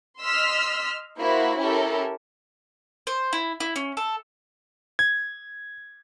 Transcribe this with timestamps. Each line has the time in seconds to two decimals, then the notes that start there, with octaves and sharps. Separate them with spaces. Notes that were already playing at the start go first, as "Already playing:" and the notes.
0.21 D#5 C6 E6 F6 B6
1.16 A#3 E4 F#4 C5 B5
1.58 C#4 E4 G4 A4 A#4
3.07 C5
3.33 E4
3.60 E4
3.76 C#4
3.97 A4
4.99 G#6